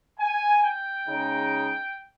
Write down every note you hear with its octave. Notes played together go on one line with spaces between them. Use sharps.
G#5
G5
C#3 G#3 D#4